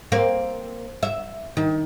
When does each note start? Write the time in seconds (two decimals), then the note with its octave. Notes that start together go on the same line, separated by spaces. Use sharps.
0.12 A#3 C4
1.03 E5
1.57 D#3